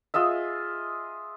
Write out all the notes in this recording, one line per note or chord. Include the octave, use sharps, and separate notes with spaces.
F4 G#4 D#5 E5